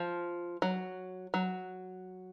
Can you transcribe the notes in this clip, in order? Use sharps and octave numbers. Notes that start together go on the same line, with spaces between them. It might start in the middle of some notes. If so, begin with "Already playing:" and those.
Already playing: F3
F#3
F#3